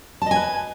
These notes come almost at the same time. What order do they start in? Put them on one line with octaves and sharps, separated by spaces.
A5 D#5 G#5 B4